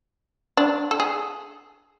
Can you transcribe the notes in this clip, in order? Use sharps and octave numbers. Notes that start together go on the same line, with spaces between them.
D4
A4
G#4